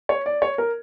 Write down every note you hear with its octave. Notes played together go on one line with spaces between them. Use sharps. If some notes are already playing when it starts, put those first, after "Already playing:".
C#5
D5
C#5
A#4